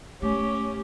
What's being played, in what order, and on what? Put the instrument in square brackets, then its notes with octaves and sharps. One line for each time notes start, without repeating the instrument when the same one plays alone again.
[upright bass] A3 [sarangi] C#4 [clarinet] G4